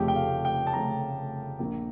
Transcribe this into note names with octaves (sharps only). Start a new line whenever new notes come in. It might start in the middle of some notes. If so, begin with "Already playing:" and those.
Already playing: F1 F2 C#3 F3 A3 G4
G5
F5
G5
A5
F1 F2 C#3 F3 A3 A#5
A#1 A#2 F3 A#3